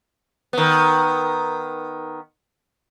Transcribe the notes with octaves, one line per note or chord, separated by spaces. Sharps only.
D#3 B3